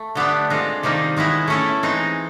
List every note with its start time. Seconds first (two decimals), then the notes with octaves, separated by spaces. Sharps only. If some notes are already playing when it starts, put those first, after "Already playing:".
Already playing: A3
0.15 D3 G3 B3 D4 G4
0.50 G#3 C4 F4 A4
0.83 C3 D#3 G3 A#3 D#4
1.17 D#3 G#3 B3 E4
1.48 A3 C#4 E4 A4
1.83 E3 G#3 C4 D#4